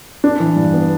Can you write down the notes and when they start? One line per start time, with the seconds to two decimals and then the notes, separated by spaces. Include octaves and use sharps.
0.24 D4
0.40 E3
0.56 G2
0.73 B3